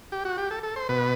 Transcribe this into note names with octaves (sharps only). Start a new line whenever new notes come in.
G4
F#4
G4
A4
A4
C5
B2 B4